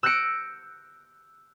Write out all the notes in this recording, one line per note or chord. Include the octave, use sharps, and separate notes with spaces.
E6 F#6 G6 A#6 C#7 D7